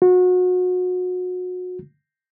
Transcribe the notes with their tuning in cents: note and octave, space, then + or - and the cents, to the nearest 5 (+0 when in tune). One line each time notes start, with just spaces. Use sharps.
F#4 -30